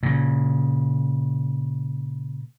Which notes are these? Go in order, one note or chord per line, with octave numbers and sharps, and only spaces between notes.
A#2 C#3